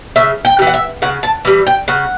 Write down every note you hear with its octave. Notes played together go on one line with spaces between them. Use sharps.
C#3 E5
G5
G3
E3
F#5
E5
C#3 F#5
A5
E3 G3
G5
C#3 F#5